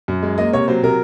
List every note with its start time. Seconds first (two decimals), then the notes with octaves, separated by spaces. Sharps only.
0.08 F#2
0.23 G#3
0.38 A#3 D#5
0.53 C3 C#5
0.68 F#3 C5
0.83 C3 A#4